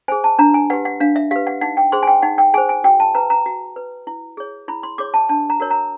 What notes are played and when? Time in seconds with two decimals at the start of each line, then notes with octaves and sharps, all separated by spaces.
0.08 G#4 C5 G#5
0.24 A5
0.39 D4 A#5
0.54 G#5
0.70 G4 B4 F#5
0.85 F#5
1.01 D4 F5
1.16 E5
1.31 G4 B4 F5
1.47 F#5
1.61 D#4 F#5
1.77 G5
1.92 G#4 C5 C6
2.03 G#5
2.07 G5
2.23 D#4 F#5
2.38 G5
2.54 G#4 C5 G#5
2.69 G#5
2.84 F#4 G5
3.00 A5
3.15 B4 A#5
3.30 A#5
3.46 F#4
3.76 B4
4.07 E4
4.37 G#4 C#5
4.68 E4 B5
4.83 C6
4.98 G#4 C#5 D6
5.14 A5
5.29 D4 A5
5.50 A#5
5.60 F#4 A#4 C#5
5.70 A#5